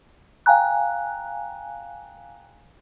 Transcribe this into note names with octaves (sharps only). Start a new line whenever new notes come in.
F5 G5 G#5 A#5 F#6